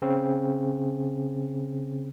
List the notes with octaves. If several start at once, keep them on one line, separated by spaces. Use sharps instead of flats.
C#3 C4